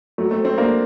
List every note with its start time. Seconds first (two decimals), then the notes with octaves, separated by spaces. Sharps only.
0.18 F#3 A3
0.31 A3 C4
0.44 A3 C4
0.57 A#3 D4